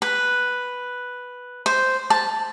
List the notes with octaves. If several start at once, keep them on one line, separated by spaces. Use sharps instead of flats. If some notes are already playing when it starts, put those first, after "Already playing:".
B4
C5
A5